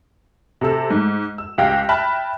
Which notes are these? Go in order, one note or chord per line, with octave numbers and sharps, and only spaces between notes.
C3 A4 E6
G#2
E6
C#2 G4 F5 G5 A#6
E5 G5 A5 B5 F6 F#6